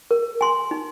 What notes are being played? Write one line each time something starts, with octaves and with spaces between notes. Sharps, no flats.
A#4
G#5 C6
D#4